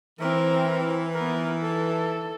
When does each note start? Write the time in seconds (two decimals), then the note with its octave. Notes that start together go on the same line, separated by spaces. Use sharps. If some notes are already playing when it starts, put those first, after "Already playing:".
0.20 E3 C4 A#4
1.13 B3 A#4
1.62 A4